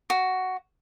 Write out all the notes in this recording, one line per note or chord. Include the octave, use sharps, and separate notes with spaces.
F#4